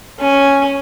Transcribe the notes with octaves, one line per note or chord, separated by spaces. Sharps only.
C#4 G#5